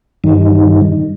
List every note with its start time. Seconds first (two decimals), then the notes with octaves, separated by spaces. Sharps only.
0.24 G2 D#3